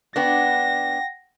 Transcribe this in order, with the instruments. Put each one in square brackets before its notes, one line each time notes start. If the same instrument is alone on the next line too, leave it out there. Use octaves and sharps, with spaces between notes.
[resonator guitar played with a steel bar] B3 D4 [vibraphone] F#5 G5 [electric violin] A#6